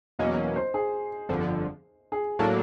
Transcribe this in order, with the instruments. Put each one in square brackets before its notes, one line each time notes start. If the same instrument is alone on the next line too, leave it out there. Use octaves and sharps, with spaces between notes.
[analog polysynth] E2 B2 F#3 A#3 C#4 [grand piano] D#5
[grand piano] C5
G#4
[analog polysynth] G1 F2 D3 F3
[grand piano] G#4
[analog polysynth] A2 F#3 A#3 D4 [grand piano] A4